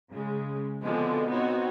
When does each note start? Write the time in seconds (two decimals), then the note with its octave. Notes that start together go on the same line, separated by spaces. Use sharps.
0.12 C#3 G#3
0.83 B2 D3 F3 G#3 B3 C4
1.29 B3 C4 D#4 F#4 C#5